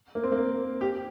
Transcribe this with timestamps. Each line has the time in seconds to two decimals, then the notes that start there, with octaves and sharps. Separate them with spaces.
0.15 A#3
0.23 C4
0.32 A#3
0.81 G4